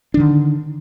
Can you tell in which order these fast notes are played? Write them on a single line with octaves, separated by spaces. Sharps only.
D4 D#3 D3